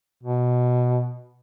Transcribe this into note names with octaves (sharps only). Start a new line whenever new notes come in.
B2